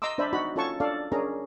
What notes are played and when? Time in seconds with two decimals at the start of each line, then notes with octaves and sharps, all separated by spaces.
0.02 D#5 A#5 C6 D6 E6
0.18 D4 C5 D5 E5 B5
0.33 D#4 F#4 B5
0.56 C#4 F4 A4 C#5 A5 C#6
0.80 D4 A4 D5 F5
1.12 C#4 D4 G#4 A#4 A#5